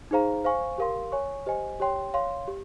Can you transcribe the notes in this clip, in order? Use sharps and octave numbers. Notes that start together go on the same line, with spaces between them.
D#4 G#4 C5 F5 A#5
C5 F5 G#5 C#6
G4 A#4 F5 C6
C#5 G#5 C#6
G4 C5 D#5 G#5
G4 C#5 G5 C6
C#5 F5 C6
G4